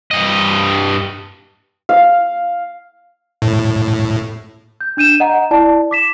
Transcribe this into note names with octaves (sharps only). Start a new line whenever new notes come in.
G2 D#5
F5
A2
G6
D4 G6 D#7 E7
D#5 F#5 A#5
E4 D5 A5
D6 B6 E7